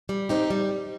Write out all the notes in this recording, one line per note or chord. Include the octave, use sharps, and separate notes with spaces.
G3
C4 D#4 G4
G3